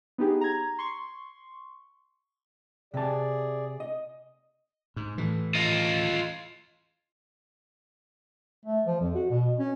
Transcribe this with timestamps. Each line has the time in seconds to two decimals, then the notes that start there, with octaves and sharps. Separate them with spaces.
0.18 B3 D#4 G4 G#4
0.41 A#5 G#6
0.79 C6 C#6
2.94 C3 G#4 D5 A5
3.80 D#5
4.96 G#2
5.18 A2 E3
5.55 F4 D#5
8.66 A3
8.86 F3
9.01 F2
9.15 F#4
9.30 B2
9.59 C#4